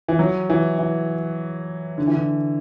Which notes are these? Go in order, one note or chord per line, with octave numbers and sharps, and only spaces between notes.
E3
F#3
E3
E3
D3
E3
D3